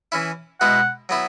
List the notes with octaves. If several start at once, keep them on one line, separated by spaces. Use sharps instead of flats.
E3 C#4 E4
B2 G#3 E4 F#5
F#3 B3 E4